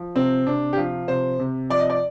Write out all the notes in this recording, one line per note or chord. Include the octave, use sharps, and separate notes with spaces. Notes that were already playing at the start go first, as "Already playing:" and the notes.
Already playing: F3
C3 C4
C3 D4
G4
F3 F4
C3 C5
C3
F3 D5
D#5
D5